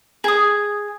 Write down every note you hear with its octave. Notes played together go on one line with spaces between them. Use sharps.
G#4 D#6